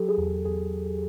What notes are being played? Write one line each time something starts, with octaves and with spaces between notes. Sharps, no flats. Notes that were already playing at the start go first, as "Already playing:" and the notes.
Already playing: F#3 G4 A4
G#4
E2
G#4
E2 G#4